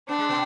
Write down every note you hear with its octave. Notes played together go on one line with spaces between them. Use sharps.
B3 D4
G#3
B2 B3